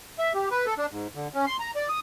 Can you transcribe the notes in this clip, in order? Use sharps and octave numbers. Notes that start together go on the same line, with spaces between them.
E5
G4
B4
A4
D4
G#2
D3
C#4
C6
A#5
D5
D#6